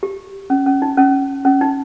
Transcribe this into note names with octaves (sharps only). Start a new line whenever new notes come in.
G4
C#4
C#4
D#4
C#4
C#4
D#4